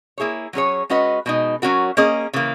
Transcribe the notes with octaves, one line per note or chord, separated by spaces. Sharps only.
A#3 E4 G#4 C#5
F#3 C#4 G#4 C#5
G#3 C#4 F#4 B4 D#5
B2 G#3 D#4
F#3 C#4 F#4 A#4
A#3 C#4 G#4 D#5
C#3 E3 A#3